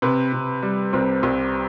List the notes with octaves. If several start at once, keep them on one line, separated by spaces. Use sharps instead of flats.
C3 B4
C3
G3
C2 C4
C2